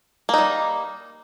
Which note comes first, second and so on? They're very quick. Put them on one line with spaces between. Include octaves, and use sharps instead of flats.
A#3 D#4 G3